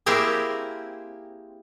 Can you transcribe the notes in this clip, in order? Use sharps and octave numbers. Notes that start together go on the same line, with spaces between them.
A#3 C4 E4 G4 G#4 A#4